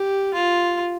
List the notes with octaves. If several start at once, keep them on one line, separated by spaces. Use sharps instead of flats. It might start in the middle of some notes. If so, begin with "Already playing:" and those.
Already playing: G4
F4